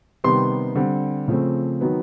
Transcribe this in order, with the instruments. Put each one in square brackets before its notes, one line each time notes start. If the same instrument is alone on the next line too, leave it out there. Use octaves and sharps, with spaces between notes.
[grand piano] C3 D#3 G3 B3 C6
D3 G3 C4
C#3 F3 A3 C4
D#3 F#3 B3